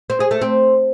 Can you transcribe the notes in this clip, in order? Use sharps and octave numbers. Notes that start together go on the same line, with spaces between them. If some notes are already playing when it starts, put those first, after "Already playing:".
C4
G#4
A3
C4